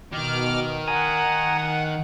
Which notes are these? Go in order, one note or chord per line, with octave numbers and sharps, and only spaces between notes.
B2 D#3 D6 F6
F#5 G#5 A#5 D#6